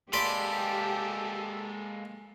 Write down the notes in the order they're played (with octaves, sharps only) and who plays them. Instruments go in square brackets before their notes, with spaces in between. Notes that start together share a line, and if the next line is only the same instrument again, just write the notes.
[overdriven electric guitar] G#3 A#3 [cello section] G4 [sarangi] A4 [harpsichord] D5 B5 C6